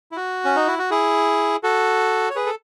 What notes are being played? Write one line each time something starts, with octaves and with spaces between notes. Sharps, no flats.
E4
F#4
C#4
D#4
E4
F#4
E4 G#4
F#4 A4
C#5
G#4 B4
A4